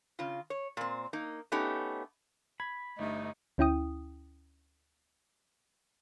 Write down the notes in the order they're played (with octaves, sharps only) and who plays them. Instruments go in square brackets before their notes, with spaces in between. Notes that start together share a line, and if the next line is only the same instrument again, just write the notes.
[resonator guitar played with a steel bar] C#3 F4
C#5
A#2 C4
A#3 D#4
A3 B3 C#4 D#4 G4
[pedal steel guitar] B5 [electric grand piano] G#6
[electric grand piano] G1 G2 [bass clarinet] A3 [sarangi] D#4
[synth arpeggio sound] D2 C#4 E4 G5 D#6